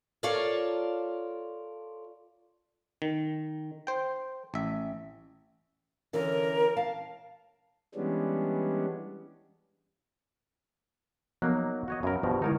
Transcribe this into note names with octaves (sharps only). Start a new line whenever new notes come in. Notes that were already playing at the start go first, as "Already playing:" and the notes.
F4 A4 A#4 C#5 D5 F5
D#3
C5 G5
A1 E5
D3 E3 C#4 A#4
F5 A5
E3 G3 G#3 B3 C#4 D4
F3 F#3 A#3 B3 D#4 F#6
F#4 C#5 D#5
F#2 A#4 F5 B5
G2 B2 F3
D3 G#3 D#4 E4 A#4 C#5